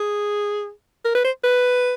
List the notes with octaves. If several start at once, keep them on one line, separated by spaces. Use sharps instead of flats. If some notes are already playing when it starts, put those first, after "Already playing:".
Already playing: G#4
A#4
B4
C5
B4